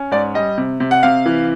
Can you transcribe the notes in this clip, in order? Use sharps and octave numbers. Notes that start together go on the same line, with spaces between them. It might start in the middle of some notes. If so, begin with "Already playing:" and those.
Already playing: C#4
G#2 D5
G3 D#5
C3
C3
F#5
C3 F5
E3